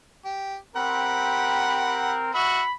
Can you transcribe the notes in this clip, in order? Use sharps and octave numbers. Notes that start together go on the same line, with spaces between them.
G4
C4 G4 A#4 F#5 B5
F#4 E5 B5